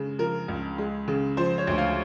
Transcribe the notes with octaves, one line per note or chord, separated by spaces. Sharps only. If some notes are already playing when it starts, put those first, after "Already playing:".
Already playing: C#3 G#3
F3 A#4
C#2
G#3
C#3
F3 C5
C#5
D2
F5